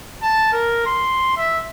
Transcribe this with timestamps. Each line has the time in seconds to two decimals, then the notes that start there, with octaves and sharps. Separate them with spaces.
0.23 A5
0.53 A#4
0.86 C6
1.37 E5